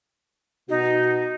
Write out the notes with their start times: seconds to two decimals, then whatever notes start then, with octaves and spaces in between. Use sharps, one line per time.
0.69 B2 D#4 F#4